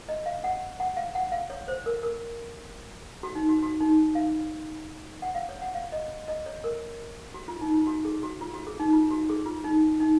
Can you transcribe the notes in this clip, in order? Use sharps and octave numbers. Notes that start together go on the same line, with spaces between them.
D#5
F5
F#5
F#5
F5
F#5
F5
C#5
C5
A#4
A#4
F#4
D#4
F#4
F#4
D#4
F5
F#5
F5
C#5
F#5
F5
D#5
D#5
C#5
A#4
F#4
F4
D#4
F4
F#4
G#4
F#4
F4
F#4
G#4
D#4
F4
F#4
G#4
F4
D#4
D#4